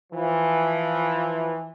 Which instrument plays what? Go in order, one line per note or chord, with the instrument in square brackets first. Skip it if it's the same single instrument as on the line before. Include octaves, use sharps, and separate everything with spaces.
[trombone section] E3 F3